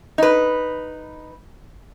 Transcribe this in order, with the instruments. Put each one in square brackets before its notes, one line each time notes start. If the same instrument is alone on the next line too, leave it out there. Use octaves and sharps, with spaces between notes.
[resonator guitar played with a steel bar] D#4 B4